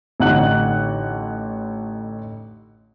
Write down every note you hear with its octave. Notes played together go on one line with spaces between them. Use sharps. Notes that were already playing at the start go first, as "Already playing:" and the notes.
A1 D3 D#4 F#5 F#6 F#7